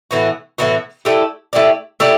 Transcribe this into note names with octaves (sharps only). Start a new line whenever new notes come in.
A2 E3 B3 F#4
A2 E3 B3 F#4
A3 E4 G4 D5
A3 E4 G4 D5
A3 E4 G4 D5